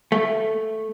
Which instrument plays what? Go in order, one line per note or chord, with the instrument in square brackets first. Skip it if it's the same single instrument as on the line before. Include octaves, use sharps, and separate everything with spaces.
[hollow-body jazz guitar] A3